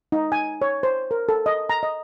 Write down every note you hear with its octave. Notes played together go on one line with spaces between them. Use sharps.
D#4
G#5
C#5
C5
A#4
A4
D#5
A#5
D#5